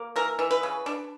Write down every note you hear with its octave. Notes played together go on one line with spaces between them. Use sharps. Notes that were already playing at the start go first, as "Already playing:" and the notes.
Already playing: A#3
E3 A#4
E3
B4
C#3
D4